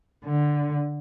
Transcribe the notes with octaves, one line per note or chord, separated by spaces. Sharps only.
D3